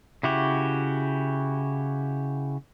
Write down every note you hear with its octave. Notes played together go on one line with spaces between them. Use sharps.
C#3 E4 F#4 G4